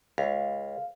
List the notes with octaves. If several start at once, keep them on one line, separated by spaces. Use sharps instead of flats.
C#2 F5